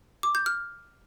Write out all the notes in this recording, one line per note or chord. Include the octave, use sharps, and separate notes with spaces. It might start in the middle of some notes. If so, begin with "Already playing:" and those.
D6
G6
F6